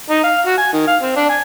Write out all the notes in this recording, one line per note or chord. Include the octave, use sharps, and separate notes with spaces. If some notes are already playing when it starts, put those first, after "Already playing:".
D#4
F5
F#4
G#5
D#3
F5
C4
D4
G#5